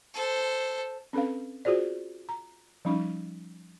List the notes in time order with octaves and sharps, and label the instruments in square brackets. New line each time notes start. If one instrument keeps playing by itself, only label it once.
[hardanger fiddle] A4 C5
[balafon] C4 C#4 A4 B4 F5
F4 F#4 G#4 C5 D5
A#5
F3 G3 C#4 D#4